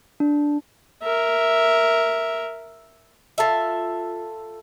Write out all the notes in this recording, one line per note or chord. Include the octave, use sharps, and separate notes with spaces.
D4
A#4 E5
F4 A4 E5